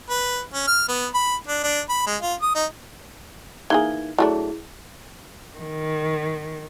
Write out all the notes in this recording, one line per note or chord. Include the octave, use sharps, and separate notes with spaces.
B4
C#4
F6
B3
B5
D4
D4
B5
G#3
F4
D#6
D#4
E3 A#3 D#4 G#4 G#6 G7
F#3 A3 D4 E4 G#4
D#3